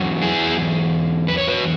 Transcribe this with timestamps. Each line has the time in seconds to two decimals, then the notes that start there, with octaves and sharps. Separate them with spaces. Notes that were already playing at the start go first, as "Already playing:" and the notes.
Already playing: E2 F#3
0.22 E4 G#4
1.28 B4
1.38 C#5
1.47 F#4 B4